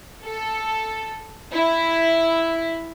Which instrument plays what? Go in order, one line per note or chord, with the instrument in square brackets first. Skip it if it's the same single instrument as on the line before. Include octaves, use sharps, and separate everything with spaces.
[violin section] A4
E4